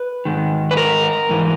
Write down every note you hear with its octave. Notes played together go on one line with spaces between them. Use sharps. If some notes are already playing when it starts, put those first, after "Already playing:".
Already playing: B4
G#2 D#3
B4
A#4
G#2 E3